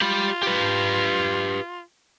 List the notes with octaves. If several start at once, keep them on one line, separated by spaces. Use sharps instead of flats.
F4 G4 B5
G4 B4